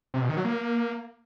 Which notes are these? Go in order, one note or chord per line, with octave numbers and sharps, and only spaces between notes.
C3
B2
D#3
F#3
A#3